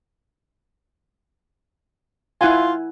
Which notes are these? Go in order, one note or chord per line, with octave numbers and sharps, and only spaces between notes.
E4 F4 F#5 G#5